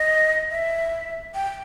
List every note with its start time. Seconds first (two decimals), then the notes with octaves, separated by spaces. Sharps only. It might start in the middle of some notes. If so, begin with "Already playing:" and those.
Already playing: D#5
0.51 E5
1.35 G5